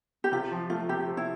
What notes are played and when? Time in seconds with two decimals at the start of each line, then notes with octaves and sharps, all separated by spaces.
0.24 G4
0.32 C3 F4
0.52 F3
0.70 A3 F4
0.89 C3 G4
1.07 C3
1.17 E4